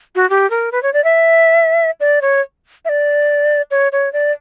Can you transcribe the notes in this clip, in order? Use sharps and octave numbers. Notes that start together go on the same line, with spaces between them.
F#4
G4
A#4
B4
C#5
D5
E5
D5
C#5
E5
D5
C#5
C#5
D5